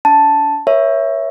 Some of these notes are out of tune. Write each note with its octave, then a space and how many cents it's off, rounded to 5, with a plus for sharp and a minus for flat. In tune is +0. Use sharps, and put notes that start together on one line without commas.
D4 -45 A5 +0
A#4 +45 C#5 +0 E5 +0